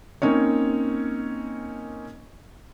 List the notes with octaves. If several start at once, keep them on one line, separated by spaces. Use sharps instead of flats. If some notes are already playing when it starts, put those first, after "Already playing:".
A#3 C4 C#4 D#4 C#5